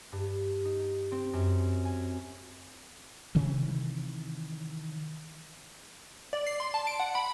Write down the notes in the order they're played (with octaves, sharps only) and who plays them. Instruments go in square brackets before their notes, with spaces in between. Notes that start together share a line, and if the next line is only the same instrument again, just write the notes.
[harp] G2
D#4
C4
F#2
G#5
[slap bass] C3 D#3 E3
[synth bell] D5
C7
C6
A5
D7
F#5
B5